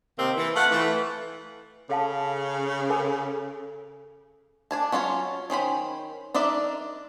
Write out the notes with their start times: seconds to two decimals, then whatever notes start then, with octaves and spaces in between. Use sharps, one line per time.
0.18 C3 D#3 A#3 C4
0.37 E3
0.56 A3 F4 B4 F#5
0.71 E3 A3
1.89 C#3 A4 F5 A5
2.90 A4 A#4 G#5
4.71 D4 G#5 A5
4.92 F#3 C#4 F4 A4 C#5
5.50 D#3 C#4 C5 B5
6.34 D4 D#4 A#4 D5 E5